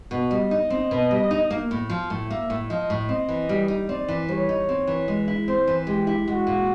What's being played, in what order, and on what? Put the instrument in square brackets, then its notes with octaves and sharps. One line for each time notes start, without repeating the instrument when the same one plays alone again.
[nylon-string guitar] B2
[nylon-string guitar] G3 [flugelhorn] D#5
[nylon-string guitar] D#4
C4
B2
G3
D#4
A#3
A2
F3
A2
[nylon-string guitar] A#3 [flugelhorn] E5
[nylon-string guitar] A2
[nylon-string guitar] F3 [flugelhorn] D#5
[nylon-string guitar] A2
[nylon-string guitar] C4 [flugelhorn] D#5
[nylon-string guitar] E3
G3
D#4
[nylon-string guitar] C4 [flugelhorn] D5
[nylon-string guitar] E3
[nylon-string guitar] G3 [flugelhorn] C#5
[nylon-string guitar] D#4
C4
E3
G#3
E4
[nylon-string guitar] C4 [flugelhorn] C5
[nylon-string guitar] E3
[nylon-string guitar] G#3 [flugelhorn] G4
[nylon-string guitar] E4
[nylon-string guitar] G#3 [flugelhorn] F#4
[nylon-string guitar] A#2